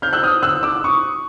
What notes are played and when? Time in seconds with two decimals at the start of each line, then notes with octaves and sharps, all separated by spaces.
0.02 F6 G6
0.13 E6 F#6
0.23 D#6 F6
0.42 E6 F#6
0.63 D6 E6
0.84 C#6 D#6